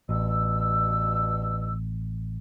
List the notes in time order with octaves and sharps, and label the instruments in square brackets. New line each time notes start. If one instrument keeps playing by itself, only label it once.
[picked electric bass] A1 [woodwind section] G2 B2 E6